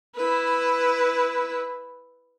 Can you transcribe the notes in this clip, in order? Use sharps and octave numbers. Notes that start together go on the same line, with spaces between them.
E4 B4